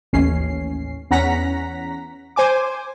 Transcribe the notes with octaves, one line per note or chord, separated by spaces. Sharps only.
A1 D#2 C#4 C7
E2 C#4 F#5 A#5 A#6 B6
C5 G#5 D6